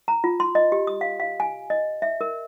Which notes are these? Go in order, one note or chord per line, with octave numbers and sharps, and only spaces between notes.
A#5
F4
C6
D#5
G4
D#6
F5
F5
G#5
D#5
E5
A#4